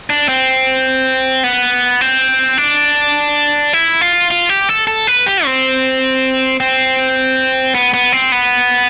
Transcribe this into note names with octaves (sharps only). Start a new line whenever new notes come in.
D4
C4
B3
C4
D4
E4
F4
F4
G4
A4
A4
B4
G4
C4
C4
B3
B3
C4
B3